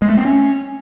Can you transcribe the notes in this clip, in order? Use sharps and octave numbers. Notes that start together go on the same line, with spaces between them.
G#3
A3
C4
C#4